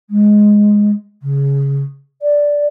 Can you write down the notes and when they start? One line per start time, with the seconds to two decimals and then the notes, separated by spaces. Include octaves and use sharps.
0.10 G#3
1.22 C#3
2.22 D5